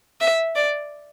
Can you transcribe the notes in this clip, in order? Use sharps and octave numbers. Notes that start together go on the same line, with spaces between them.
E5
D5